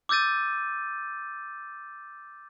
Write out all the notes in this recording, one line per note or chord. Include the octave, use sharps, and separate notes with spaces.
D6 E6 G6 A6 D#7